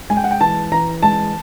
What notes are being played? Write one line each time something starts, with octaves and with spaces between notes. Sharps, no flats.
G#3 G#5
G5
F#5
G5
E3 A5
E3 A#5
G#3 A5